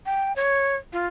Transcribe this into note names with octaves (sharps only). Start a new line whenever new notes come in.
G5
C#5
F4